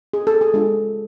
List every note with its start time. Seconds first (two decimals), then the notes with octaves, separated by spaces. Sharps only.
0.13 G#4
0.27 A4
0.41 G#4
0.54 G#3 D4 F4 A4